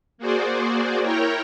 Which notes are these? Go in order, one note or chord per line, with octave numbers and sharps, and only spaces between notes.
A#3 F#4 G#4 C5 D5
E4 A#4 C#5 G5 A#5